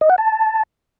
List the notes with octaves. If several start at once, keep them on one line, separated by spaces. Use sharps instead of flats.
D#5
F#5
A5